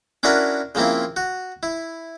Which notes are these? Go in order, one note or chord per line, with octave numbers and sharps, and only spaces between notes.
C#4 D4 E4 F#4 A#4 B4
C#3 F3 A#3 C4 E4
F#4
E4